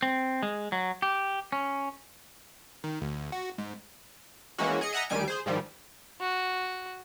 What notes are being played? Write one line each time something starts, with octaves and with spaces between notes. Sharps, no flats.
C4
G#3
F#3
G4
C#4
D#3
D2
F#4
G#2
E3 G#3 A#3 C#4 F#4
G#4 D#5 C#7
D#5 E5 F#5 G#5 A#5
D2 D#3 G3 G#5 D7
G#4 C5
G#2 D#3 F3 G3
F#4